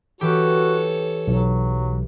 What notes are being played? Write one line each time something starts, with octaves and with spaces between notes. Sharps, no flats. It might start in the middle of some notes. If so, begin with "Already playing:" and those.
E3 F#4 G4 A4 C#5
B1 F#3